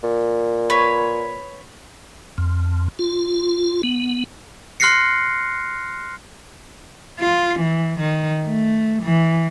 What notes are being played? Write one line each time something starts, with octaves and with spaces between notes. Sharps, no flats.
A#2
B4 C#5
F2
F4
B3
C6 F6 F#6 A#6 C7 C#7
F4
E3
D#3
A3
E3